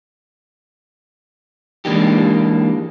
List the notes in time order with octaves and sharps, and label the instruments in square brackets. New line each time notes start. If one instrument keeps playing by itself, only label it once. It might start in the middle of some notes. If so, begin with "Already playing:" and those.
[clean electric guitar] E3 G#3 A#3 D4 D#4 G4